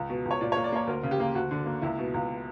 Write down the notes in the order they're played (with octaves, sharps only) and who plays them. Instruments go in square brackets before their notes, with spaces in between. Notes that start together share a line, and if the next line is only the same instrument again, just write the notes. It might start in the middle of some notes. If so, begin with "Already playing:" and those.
Already playing: [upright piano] C#2
B2
C#2
C#5
A#2 D5
A#3 C#5
D5
A#3 C#5
D2 A#4
C#3
G4
A#3
D2 F#4
D3
A#3
C#2 E4
B2
C#2